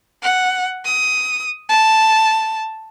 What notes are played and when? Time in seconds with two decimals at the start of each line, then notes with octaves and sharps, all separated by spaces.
0.23 F#5
0.85 D#6
1.69 A5